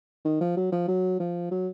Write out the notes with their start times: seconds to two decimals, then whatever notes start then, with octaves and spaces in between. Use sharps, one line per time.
0.24 D#3
0.41 F3
0.56 F#3
0.72 F3
0.88 F#3
1.20 F3
1.51 F#3